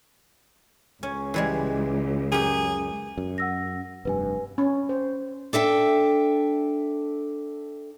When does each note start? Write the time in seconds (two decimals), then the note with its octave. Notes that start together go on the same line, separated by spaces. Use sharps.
1.03 C#2 C#4
1.34 E3 G3 G#3
2.32 F#2 G4 G#4
3.18 F#2
3.38 F#5 E6 A#6
4.05 F1 G2 B4 G#5
4.58 C#4
4.89 C5
5.53 D4 A4 E5 G5